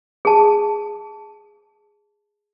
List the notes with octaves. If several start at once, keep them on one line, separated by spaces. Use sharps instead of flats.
G#4 A5